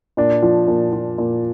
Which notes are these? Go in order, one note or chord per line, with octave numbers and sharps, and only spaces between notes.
A#2 D4
F3
A#2
F3
A#2